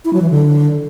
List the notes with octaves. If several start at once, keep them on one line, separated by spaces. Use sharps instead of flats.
E4
F#3
E3
D3